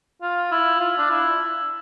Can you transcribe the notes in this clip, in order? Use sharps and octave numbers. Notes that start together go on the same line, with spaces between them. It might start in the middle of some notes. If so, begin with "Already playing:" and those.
F4
E4
F4
D4
E4